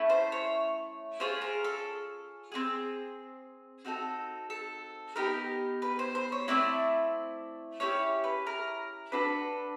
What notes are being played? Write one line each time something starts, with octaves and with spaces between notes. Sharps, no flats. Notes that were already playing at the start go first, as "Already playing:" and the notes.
Already playing: A3 C#4 E4
C5
C#5
C#4 F4 G#4 C5
A#4
A4
C4 F4 G#4
C4 D#4 F#4 A4
A4
B3 D#4 G4 A#4
B4
C5
C5
C#5
A3 C4 E4 D5
C#4 E4 G4 C#5
B4
A#4
D4 F#4 A4 B4